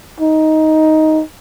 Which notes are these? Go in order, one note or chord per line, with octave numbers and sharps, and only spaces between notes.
D#4